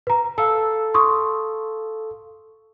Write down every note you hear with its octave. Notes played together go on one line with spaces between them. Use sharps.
B4 A#5
A4 F5 E6
C6 C#6 D#6